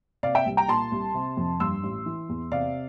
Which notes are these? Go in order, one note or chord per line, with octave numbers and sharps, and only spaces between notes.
C3 D5 F5
E5 G5
C2
G5 A#5
A#2 A5 C6
C2
C3
F2
G2 C6 E6
A1
E3
E2
C3 D5 F5